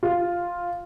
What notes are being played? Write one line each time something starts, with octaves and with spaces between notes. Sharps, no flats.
F4